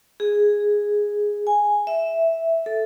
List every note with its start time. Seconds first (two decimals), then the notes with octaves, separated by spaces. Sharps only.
0.20 G#4
1.47 G#5
1.87 E5
2.66 A4